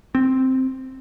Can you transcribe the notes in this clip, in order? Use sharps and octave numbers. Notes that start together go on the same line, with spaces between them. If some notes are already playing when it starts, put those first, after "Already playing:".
C4